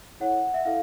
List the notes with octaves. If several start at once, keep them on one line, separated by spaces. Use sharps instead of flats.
E4 A4 C#5 F#5
E5
E4 A4 F5